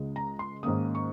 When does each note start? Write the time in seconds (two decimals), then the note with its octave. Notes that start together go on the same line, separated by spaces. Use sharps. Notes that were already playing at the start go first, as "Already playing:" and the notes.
Already playing: C#2 C#3 G#3
0.16 A#5
0.39 C6
0.63 G#2 D#3 A#3 C#4 D#6
0.95 C#6